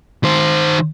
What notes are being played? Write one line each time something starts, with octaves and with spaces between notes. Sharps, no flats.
D#3 C5